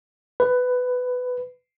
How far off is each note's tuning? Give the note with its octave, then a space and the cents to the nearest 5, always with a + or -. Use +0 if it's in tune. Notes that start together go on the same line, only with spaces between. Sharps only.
B4 +15